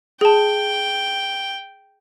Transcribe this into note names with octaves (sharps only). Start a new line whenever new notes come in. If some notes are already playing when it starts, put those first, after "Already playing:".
G#4 G5 A5